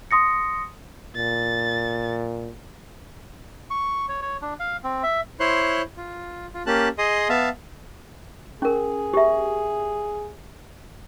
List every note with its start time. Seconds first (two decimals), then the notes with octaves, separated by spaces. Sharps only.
0.11 C6 D#6 A#6 C#7
1.16 A#2 A6
3.70 C#6
4.09 C#5
4.22 C#5
4.42 D4
4.60 F5
4.84 C4
5.03 E5
5.40 E4 C5 C#5 C6 F#6
5.97 F4
6.54 F4
6.66 A#3 C#4 G4 A5 F#6
6.98 G#4 D#5 C6 D#6
7.29 B3 E5 F5 A5
8.62 C#4 G#4 A#4
9.13 G4 E5